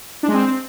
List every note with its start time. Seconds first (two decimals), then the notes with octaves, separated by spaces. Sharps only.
0.23 D4
0.28 G#3
0.33 C4